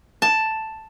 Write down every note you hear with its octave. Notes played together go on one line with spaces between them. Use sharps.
A5